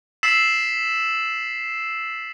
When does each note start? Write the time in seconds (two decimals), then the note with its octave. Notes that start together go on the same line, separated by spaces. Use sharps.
0.23 E6 A6 B6 C7 E7 F#7